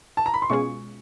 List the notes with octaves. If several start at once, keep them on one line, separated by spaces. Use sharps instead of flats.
A5
A#5
B5
C6
B2 G#3 C#4 F4 G#4 C#6